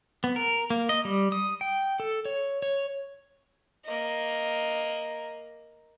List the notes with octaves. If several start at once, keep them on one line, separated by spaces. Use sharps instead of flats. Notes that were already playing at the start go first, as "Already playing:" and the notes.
B3
A#4
A#3
D#5
G3
D#6
G5
A4
C#5
C#5
A#3 D#5